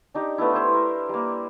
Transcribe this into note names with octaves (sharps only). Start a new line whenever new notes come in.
D4 D#4 G4
A3 B3 D4 E4
E4 G4 C5
A#4
G3 A#3